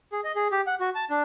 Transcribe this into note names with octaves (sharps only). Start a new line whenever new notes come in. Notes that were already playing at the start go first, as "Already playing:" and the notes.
G#4
D#5
G#4
G4
F#5
F#4
A5
D4